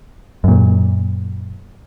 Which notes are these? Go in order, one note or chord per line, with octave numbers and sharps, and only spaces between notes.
F#2 A#2